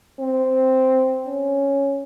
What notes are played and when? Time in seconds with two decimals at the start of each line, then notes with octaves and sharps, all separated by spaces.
0.20 C4
1.26 C#4